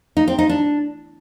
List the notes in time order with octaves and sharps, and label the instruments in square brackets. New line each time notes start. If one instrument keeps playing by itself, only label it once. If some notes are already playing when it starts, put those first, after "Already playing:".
[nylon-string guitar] D#4
C4
D#4
D4